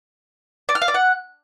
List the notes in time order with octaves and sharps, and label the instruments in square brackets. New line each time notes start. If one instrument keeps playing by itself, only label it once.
[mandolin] D5
F6
F5
D5
F#5